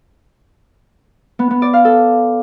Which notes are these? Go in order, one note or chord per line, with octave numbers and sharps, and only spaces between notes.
B3
B3
D5
F5
A4